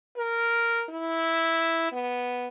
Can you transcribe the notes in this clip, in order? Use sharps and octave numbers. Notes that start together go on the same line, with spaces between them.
A#4
E4
B3